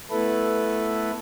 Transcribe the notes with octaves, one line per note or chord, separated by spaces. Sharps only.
A3 B3 E4 A4 B4